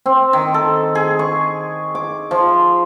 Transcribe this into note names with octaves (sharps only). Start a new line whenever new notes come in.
C4
D#3
A4
G#4
C#6
D6
F3